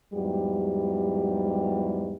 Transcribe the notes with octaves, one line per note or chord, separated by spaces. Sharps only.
E2 G#2 F#3 G3 G4